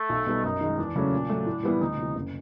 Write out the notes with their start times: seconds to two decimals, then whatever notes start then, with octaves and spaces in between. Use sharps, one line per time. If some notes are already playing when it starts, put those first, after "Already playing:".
Already playing: A3
0.09 B1
0.26 B2 G3 B3 D#4
0.44 F#2 D#4
0.61 D#3 G#3
0.78 E2 D4
0.95 C#3 F#3 A3 C#4
1.13 A#2
1.30 F#3 A3
1.46 A2
1.63 E3 G3 B3 E4
1.81 D2 D#4
1.98 C3 E3
2.15 F#1